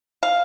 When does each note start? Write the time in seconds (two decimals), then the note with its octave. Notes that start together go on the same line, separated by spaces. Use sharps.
0.23 F5